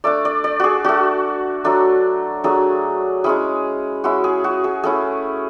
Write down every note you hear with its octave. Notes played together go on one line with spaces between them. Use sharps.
A3 D4 D5
D5
D5
F#4 G#4
A3 D4 F#4
F#3 A3 D4
F#3 A3 D4 G#4
G#3 C#4 E4 G#4
G#3 C#4 E4 F#4
G#4
F#4
G#4
A3 C#4 E4 G#4